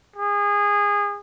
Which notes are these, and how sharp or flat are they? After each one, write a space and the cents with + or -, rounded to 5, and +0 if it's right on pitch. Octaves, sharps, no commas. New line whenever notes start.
G#4 -25